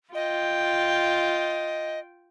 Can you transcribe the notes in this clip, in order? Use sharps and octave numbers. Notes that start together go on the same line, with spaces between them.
F4 D#5 G5